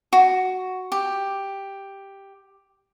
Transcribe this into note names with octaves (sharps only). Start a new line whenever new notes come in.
F#4
G4